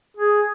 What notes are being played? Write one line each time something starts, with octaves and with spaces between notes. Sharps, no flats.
G#4